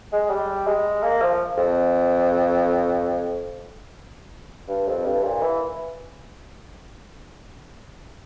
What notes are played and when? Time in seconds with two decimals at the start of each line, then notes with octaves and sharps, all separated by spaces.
0.12 G#3
0.30 G3
0.67 G#3
1.03 A#3
1.21 F3
1.57 F2
4.68 G2
4.87 F2
5.05 G2
5.23 A#2
5.42 E3